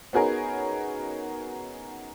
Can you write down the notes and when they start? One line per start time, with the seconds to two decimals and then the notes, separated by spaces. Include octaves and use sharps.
0.13 B3 C#4 D#4 F#4 G#4 A#4